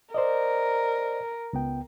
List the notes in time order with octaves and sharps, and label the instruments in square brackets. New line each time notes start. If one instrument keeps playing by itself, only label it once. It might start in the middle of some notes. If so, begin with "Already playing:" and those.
[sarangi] A#4 [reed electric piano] C5 D5 D#5
[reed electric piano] C#2 B3 G5